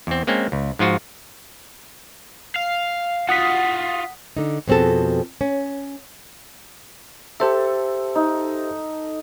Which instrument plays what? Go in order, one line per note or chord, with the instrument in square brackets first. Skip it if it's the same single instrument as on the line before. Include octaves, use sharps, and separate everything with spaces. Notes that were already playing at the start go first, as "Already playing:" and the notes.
[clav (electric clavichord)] E2 C4
G#3 A#3 C4 C#4
C#2
G#2 F3 F4 F#4
[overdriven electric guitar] F5
[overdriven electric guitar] F4 F#4 [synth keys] F#5 D#6 B6
[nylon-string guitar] D3 D#4
F2 B2 C4 G#4 A4
C#4
[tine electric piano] G4 C5 E5 [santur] A4
[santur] D#4